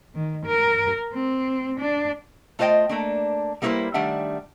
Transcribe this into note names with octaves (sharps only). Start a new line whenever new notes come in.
D#3
A#4
C4
D4
A3 F4 C5 D#5 G5
A3 A#3 D4
G3 A#3 E4 A4 B4 C5
D#3 G3 A3 D4 E5 F#5